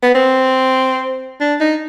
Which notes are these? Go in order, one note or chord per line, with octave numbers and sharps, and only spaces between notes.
B3
C4
D4
D#4